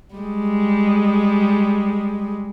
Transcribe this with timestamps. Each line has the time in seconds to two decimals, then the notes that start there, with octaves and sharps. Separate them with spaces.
0.14 G3 G#3